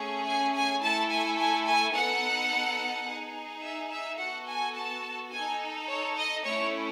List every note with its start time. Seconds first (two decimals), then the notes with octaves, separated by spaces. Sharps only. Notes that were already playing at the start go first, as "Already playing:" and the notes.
Already playing: A3 C#4 G#4
0.26 G#5
0.55 G#5
0.83 A3 E4 A4 A5
1.10 G#5
1.38 G#5
1.66 G#5
1.95 B3 D#4 A4 F#5
3.08 D#4 G#4
3.63 E5
3.91 E5
4.19 B3 F#4 A4 F#5
4.48 G#5
4.75 A5
5.32 D#4 A4 G#5
5.88 C#5
6.17 D#5
6.45 A3 C#4 E4 C#5